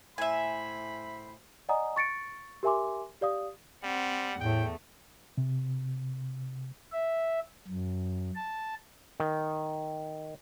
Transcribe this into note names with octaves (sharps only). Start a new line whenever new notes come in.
A2 C5 E5 G#5 B5
D5 D#5 F#5 G#5 A#5 D#6
C#6 A6 C#7 D7
G4 A#4 E5 G#5 C6 D6
G4 D5 F5 D#6
G3 C4 F#5
E2 A2 A3 G5
C3
E5
F#2
A5
D#3